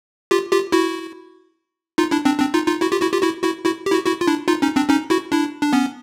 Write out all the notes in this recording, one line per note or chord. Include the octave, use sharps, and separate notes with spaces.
F4 G4
F4 G4
E4 F#4
D#4 F4
D4 E4
C4 D4
C4 D4
D#4 F4
D#4 F4
E4 F#4
F4 G4
E4 F#4
F4 G4
E4 F#4
E4 F#4
E4 F#4
G4
E4 F#4
E4 F#4
F4
D4 E4
D#4 F4
C#4 D#4
C4 D4
C#4 D#4
E4 F#4
D4 E4
D4
B3 C#4